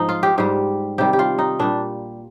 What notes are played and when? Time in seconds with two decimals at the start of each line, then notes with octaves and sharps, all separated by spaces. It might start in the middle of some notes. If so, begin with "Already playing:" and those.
Already playing: G#2 F3 D#4
0.09 F4
0.23 G4
0.38 G#2 G3 G4
0.98 C3 D#3 G3 G4
1.13 G4
1.19 F4
1.39 D#4
1.59 A#2 G3 D4